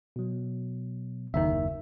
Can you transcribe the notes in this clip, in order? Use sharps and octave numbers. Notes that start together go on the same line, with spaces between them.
B2 F#3
F#1 D#2 D#3 E5